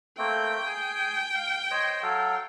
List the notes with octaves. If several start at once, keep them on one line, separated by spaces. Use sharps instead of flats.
A3 A#3 C4 G5
G#4 G#5
F5
C5 C#5 D#5
F#3 A4 F5